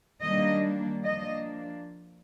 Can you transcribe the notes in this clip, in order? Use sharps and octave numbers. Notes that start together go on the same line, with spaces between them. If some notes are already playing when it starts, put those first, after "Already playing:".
D#3 G3 A#3 D4 D#5
F3 A#3 D4 D#5